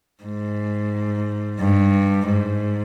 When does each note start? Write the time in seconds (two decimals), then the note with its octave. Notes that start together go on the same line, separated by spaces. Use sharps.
0.23 G#2
1.59 G2
2.27 G#2